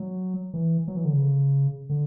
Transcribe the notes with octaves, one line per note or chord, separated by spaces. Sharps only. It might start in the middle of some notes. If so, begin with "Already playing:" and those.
Already playing: F#3
E3
F#3
E3
D3
C#3
D3